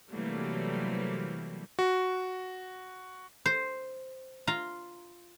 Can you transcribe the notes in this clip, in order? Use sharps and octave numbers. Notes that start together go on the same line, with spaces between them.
C3 E3 F#3 G3 A3 A#3
F#4
C5
F4 A#5